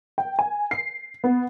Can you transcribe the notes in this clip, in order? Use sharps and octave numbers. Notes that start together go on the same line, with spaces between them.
G5
G#5
C7
B3